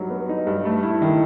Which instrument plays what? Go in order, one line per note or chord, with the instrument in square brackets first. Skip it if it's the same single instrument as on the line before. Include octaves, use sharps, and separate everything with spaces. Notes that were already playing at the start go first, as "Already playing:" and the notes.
Already playing: [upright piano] G2 F#3 D#4
B3
D#4
G2
A3
E4
D#3